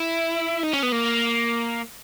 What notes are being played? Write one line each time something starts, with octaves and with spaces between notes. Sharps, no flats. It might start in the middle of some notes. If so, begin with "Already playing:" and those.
Already playing: E4
D#4
C#4
B3
A#3